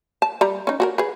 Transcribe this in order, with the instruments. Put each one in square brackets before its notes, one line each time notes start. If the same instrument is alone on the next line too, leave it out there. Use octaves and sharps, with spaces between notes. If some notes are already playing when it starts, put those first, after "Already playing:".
[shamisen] A5
G3 A#5
C#4 D#4
F#4 G#4 A#4
G#4 B4